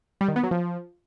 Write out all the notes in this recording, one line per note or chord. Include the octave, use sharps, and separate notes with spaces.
G3
D#3
B3
F#3
F3